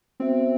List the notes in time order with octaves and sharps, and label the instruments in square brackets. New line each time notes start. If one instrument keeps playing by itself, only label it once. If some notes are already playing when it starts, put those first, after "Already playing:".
[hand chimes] B3 F#4 C5 E5 [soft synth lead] C4